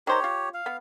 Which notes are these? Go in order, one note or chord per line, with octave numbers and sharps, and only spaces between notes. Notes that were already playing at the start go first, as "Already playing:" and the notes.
D#3 G4 C5 C#5 A#5
F4
F5
B3